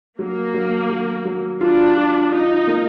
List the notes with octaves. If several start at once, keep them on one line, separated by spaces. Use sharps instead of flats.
F#3 A#3
F#3
F#3
F#3
D4 F4
F4
D#4 F4
A#3